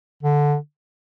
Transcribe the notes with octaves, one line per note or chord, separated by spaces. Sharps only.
D3